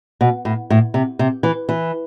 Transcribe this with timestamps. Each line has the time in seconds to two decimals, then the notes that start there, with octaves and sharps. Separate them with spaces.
0.21 B2
0.45 A2
0.70 A2
0.94 C3
1.19 C3
1.43 E3
1.69 E3